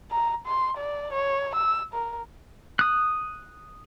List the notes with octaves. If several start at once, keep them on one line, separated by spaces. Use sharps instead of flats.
A#5
C6
D5
C#5
E6
A#4
D#6 F#6